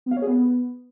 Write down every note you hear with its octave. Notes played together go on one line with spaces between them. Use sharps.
B3
F5
C#5
G#4
B3